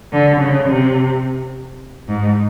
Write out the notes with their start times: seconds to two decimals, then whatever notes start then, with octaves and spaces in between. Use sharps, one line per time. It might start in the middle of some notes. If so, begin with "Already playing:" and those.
0.12 D3
0.40 C#3
0.69 C3
2.08 G#2